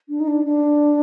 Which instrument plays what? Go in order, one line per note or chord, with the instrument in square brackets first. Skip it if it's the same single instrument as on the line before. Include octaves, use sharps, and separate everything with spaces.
[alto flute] D4
D#4
D4
D4